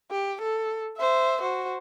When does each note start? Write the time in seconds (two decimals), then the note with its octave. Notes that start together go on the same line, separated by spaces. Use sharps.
0.11 G4
0.41 A4
0.97 C5 E5
1.41 F#4 C5